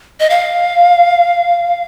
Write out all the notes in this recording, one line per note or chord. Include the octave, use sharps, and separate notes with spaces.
D#5
F5